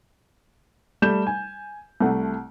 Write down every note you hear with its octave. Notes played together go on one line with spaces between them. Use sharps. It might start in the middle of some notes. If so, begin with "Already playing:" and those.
G3 A3 G6 E7
G#5
C2 A3 F#5